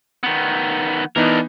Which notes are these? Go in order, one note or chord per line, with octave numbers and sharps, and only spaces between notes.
D#3 B3
E3 B3 D4 D#4 A#4